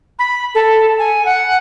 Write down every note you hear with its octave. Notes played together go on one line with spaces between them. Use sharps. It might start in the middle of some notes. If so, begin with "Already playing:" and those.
B5
A4
G#5
F#5